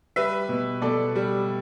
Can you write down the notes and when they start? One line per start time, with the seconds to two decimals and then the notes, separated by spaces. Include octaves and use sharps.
0.16 G3 B4 E5
0.49 B2
0.82 B2 A4 D5
1.15 G3